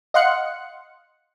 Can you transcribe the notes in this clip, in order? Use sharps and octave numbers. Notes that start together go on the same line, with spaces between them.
D#5 F5 F#5 C6 F#6 C#7